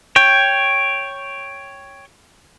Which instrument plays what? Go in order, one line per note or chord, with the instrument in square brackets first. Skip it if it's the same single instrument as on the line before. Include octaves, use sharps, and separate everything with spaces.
[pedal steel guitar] C#5 G5